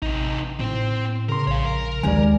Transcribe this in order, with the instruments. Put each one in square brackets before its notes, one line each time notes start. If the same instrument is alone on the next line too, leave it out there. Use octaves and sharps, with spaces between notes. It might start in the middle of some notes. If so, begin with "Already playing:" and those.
[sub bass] A1 [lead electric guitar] C3 D#4
[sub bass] A2 [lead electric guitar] C4 C5
[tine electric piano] C#3 C6 [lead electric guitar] A#4
[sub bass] A#1 [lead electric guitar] C#5 F5
[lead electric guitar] A#4
[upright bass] D#2 G#3 [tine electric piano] D5 G#5